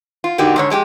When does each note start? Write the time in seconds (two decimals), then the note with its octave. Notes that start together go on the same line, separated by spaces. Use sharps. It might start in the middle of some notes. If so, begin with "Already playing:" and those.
0.24 F4
0.38 D3 A#3 D#4 F#4 G4
0.56 G#2 D3 C#5
0.70 F2 G#3 D4 G4